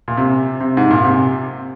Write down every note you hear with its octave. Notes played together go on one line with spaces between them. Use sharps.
A#2
C3
C3
G#2
A#2
C3